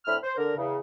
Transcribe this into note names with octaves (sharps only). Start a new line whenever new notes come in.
A2 D3 C4 E5 B5 F6
C5
D3 A#4
E2 C#3